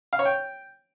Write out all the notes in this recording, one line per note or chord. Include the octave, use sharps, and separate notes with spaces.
F5
C#5
G5